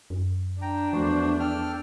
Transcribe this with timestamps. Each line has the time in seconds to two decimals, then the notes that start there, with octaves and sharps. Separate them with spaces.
0.10 F#2
0.62 D4 G5 A#5
0.93 E2 F3 A3 F#4 C5
1.40 A4 G5 F6